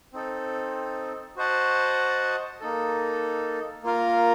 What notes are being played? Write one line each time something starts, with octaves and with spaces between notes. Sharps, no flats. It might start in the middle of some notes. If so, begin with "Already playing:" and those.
C4 D#4 A4
F#4 C5 D#5 F#5 A5
A#3 D#4 A4
A#3 F4 A#4 F5